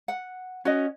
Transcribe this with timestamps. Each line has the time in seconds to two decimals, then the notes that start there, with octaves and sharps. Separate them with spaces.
0.08 F#5
0.65 C#4 F#4 D#5